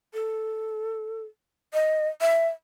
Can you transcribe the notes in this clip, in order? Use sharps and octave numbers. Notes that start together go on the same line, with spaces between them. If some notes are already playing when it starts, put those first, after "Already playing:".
A4
D#5
E5